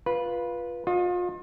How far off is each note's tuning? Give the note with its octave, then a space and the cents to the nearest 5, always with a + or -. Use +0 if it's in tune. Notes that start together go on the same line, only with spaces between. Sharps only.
F4 +0 B4 -15
F4 +35 D#5 +0